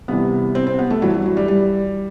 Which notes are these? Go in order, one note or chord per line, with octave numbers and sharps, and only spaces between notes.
C2 C3 E3 B3
C4
C4
B3
A3
G2 E3 F#3
F#3
F#3
G3
G3